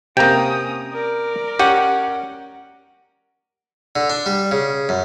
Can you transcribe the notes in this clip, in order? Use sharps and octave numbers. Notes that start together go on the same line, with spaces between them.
C3 A#3 C#4 G5 A#5 D#6
A#4 D5
C#4 G4 F#5
D3
D4
G3
C#3
F#2